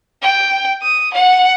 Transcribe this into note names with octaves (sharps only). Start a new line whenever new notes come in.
G5
D#6
F#5